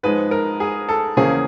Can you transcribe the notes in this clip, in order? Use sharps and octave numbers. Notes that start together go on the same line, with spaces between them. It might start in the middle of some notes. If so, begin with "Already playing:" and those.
G#2 F3 G#3 B4
A#4
G#4
A4
E2 C#3 F3 A#3 C#4 G#4